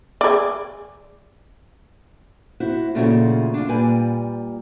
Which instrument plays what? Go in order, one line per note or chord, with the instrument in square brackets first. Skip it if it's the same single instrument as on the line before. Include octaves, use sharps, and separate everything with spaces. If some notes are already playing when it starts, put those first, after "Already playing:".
[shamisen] G#4 D5
[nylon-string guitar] E4 F#4 C5 F#5
A#2 C#3 F3 A3 E4 F#4
D4 F4
A#2 G3 B4 G#5